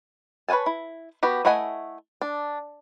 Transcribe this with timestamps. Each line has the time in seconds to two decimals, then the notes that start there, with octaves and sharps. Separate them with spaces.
0.49 B4 C#5 F#5 G#5 A5
0.66 E4
1.23 B3 F#4 G4
1.45 A3 E4 D#5 F#5 G#5
2.22 D4